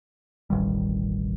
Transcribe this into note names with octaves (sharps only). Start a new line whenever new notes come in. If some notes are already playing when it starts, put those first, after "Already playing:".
E1 A1 D#3 G3